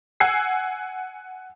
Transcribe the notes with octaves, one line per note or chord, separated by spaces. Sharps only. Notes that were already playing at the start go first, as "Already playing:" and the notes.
F#5 G#5 E6 C7